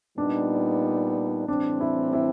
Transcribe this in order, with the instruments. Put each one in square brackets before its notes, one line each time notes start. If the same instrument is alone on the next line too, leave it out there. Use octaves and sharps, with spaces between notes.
[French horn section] A#2 G3 B3 D#4 [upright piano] D4
[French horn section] A2 E3 G3 C4 [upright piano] D4
[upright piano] E4
E4